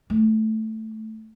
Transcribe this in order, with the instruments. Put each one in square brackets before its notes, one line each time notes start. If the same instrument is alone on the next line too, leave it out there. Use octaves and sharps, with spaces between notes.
[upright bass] A3